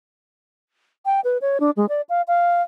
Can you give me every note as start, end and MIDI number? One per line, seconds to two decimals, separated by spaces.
1.05 1.20 79
1.24 1.38 71
1.41 1.58 73
1.60 1.70 62
1.77 1.86 56
1.89 2.01 74
2.09 2.22 77
2.28 2.62 77